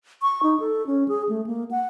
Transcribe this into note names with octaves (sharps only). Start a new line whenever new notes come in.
C#6
D#4
A4
C#4
G#4
A3
A#3
F#5